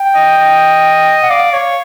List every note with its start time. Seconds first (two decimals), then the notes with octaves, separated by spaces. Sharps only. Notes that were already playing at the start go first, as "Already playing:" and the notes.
Already playing: G5
0.15 D#5
0.38 D#5
1.21 F#5
1.30 D5 F5
1.53 C#5 F5